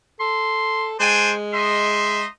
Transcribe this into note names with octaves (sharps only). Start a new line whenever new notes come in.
A4 C6
G#3 D4 C5 G5 G#5
D#4 D#5 E5 C6